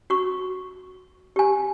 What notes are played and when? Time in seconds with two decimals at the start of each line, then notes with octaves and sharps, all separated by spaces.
0.10 F#4 C#6
1.36 G4 G#5